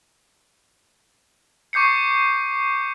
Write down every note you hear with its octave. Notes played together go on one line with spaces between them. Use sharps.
C#6 D6 G6 C7 C#7